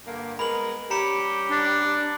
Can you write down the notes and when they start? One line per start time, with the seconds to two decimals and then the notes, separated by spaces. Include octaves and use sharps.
0.06 G2 D3 A#3
0.39 G#3 B3 A#4 B5 F#7
0.91 G3 C#4 G4 A#5 B5 C#7
1.50 D4